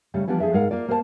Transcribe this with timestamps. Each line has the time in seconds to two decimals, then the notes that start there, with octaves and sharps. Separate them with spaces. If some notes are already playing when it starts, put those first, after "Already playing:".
0.14 C#3 G3 A3
0.28 E3 F3 G3 B3 D4
0.40 F3 G#4 A4 E5
0.53 G#2 G#3 A#4 F5 F#5
0.71 A#3 F4 D5
0.88 A#3 A#4 C5 D#5 A5